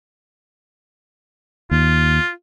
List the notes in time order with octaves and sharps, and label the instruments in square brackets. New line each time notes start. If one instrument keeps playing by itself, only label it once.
[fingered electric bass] D#2 [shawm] F4